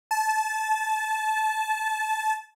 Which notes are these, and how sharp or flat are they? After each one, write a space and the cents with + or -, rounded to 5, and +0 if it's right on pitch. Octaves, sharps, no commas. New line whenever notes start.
A5 -20